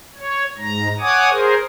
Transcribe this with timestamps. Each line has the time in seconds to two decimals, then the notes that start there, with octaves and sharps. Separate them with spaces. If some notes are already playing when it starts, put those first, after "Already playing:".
0.15 C#5
0.58 G#2 A#5
0.99 C#5 F#5 G#5 D6 D#6
1.30 G#4 A#4 C5